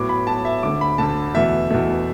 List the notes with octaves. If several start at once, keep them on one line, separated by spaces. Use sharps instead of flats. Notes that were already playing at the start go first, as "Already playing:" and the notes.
Already playing: A2 F#3 B3 D6
B5
A2 F#3 B3 A5
E5
D2 D3 A3 D6
B5
D2 D3 A3 A5
E2 B2 A3 E5
E2 B2 A3